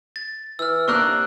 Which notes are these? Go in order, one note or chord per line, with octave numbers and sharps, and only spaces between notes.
A6
E3 E6 F6
C3 A#3 D4 C#6 E6 F#6